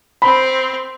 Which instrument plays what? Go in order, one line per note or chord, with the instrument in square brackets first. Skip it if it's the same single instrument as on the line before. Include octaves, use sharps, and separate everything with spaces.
[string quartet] C4 [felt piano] B5